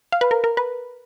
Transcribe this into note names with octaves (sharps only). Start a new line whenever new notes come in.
F5
B4
A#4
A#4
B4